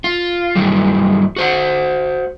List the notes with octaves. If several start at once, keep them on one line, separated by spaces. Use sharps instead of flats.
F4
G2 D#3 E3 F#3 G3
F#4 C5 F#5